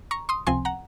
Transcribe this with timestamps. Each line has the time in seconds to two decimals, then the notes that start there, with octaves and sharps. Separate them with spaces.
0.11 A#5 C#6
0.29 C6 D#6
0.47 C#2 C3 F3 C4 G#5 C6
0.65 F#5 A#5